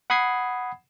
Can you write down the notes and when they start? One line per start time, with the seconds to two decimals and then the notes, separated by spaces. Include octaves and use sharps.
0.10 F#5 B5 D#6 G#6 C7